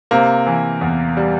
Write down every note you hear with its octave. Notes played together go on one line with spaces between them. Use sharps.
C3 A#3
E3
E2
G3